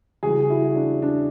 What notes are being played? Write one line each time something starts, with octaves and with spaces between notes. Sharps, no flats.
C#3 E3 G3 F#4 G#4
E4 F#4
D4
D4